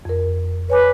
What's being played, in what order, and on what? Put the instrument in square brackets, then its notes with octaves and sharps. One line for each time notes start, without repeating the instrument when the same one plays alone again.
[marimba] F2 A#4
[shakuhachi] B4 [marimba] C#5 G#5 D6